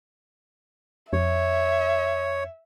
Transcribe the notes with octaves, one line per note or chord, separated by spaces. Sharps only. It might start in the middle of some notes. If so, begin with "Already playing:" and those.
F2 C#5 E5